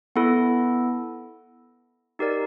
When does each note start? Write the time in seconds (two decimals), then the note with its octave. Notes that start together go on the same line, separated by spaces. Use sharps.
0.16 B3 E4 A4
2.19 D#4 G4 A#4 D5